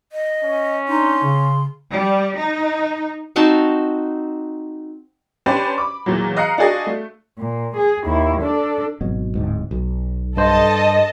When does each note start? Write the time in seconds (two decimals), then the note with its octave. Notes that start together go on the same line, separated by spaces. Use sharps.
0.12 D#5
0.44 C#4
0.88 D4 D#4 C6
1.22 C#3
1.91 G3
2.37 D#4
3.36 C4 D#4 F#4 A5
5.46 C#4 D4 G4 B4 C5 D5
5.78 B5 D6
6.06 E2 A#2 E3 F#3
6.37 D#5 F5 A#5 F#6 C7 C#7
6.58 D4 F4 F#4 G#4 D5 D#5
6.87 A3
7.38 A#2
7.77 G#4
8.06 D#2 E4
8.42 D4 A4
9.01 G#1 B2 F#3
9.35 D1 G#2
9.71 B1
10.37 G2 A4 C5 D#5 A5